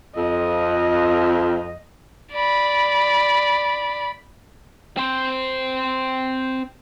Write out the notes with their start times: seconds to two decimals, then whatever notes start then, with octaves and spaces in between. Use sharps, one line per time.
0.16 F2 D#5
2.33 D5 B5
4.97 C4 C5